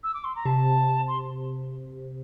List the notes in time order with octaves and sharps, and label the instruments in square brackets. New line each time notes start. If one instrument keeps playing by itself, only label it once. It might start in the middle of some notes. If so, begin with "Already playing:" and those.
[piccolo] E6
D6
C6
A#5
[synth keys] C3 [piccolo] A5
[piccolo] C6